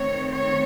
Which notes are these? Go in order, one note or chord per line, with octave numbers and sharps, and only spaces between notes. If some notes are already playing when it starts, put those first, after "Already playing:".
Already playing: D#3 A3 C4 C#5
C#5